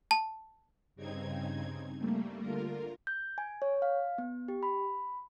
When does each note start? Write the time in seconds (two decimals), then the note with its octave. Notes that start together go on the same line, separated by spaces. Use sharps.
0.11 A5
0.95 G2 C#3 C4 D#4 G#6
1.99 G3 A3 A#3
2.40 D3 F4 A#4
3.07 G6
3.38 G#5
3.62 C#5
3.82 F5
4.18 B3
4.48 G4
4.63 B5